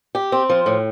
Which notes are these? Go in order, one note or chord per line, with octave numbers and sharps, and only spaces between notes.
G4
C4
F3
A2